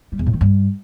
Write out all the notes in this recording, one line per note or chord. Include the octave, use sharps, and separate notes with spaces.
G3
E2
A2
D#3
G2